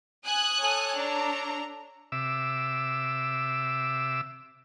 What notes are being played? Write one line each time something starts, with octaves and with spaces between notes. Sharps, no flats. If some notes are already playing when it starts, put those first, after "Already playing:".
G#5 D#6 F#6
A4 C#5
D4 A#5
C3 E5 D6 E6